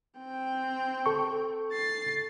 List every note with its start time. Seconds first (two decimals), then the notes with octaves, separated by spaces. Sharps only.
0.18 C4 G5
1.06 A4 C#6
1.72 A6 C7